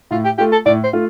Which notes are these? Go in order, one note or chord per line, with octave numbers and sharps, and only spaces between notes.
A2 F4
G4
A3 F4 G4
A4
A2 D5
C5
A3 F4